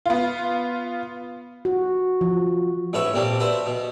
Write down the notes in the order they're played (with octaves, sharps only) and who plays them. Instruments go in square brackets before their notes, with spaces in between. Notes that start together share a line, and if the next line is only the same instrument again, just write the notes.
[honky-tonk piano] B3 F4
[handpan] F#4
F3
[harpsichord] A1 G#2 B4 C#5 E5 C#6
A#2 G3 C4 D4
F#4 B4 C5 E5
B2